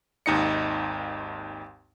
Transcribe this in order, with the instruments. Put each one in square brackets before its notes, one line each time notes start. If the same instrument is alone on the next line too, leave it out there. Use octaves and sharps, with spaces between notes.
[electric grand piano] G#1 D#2 D#4 D#5 C#7